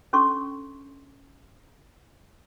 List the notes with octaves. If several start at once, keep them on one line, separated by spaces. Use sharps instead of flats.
C#4 D4 A4 C6 C#6